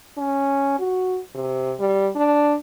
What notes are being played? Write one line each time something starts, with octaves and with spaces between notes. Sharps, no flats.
C#4
F#4
C3
G3
D4